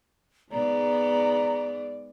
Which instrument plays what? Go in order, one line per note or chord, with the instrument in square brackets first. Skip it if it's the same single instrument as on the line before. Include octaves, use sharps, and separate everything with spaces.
[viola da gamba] G#2 G#3 B3 [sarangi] D5 [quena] A#5